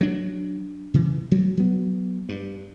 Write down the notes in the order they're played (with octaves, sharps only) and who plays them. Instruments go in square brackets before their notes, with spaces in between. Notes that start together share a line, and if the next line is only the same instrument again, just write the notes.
[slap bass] F#3 D4
C#3 E3
D2 F#3
F#3 B3
G2